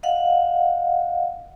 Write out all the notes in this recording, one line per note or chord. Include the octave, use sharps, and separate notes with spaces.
D#5 F5 F#5